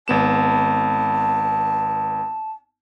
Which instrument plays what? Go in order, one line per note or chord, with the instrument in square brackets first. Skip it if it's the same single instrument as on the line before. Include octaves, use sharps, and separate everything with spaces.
[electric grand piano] G#1 B3 E7 [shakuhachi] A5